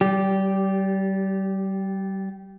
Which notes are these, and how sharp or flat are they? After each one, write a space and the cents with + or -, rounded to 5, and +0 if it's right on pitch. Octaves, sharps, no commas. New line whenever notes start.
G3 -30 G4 +0